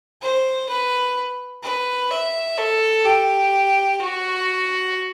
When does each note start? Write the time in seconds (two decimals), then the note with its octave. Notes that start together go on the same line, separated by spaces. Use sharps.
0.21 C5
0.69 B4
1.63 B4
2.10 E5
2.57 A4
3.05 G4
4.00 F#4